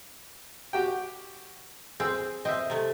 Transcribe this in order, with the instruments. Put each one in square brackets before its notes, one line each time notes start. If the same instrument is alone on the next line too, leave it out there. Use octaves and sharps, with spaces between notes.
[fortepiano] F#4 G4 G5
[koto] C4 [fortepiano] G#4 E6
[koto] C4 [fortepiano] D#5 E5
[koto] C3 A3